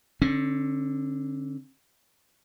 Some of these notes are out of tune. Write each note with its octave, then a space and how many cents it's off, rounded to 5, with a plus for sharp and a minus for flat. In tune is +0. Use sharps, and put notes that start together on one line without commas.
D3 +0 C#4 -45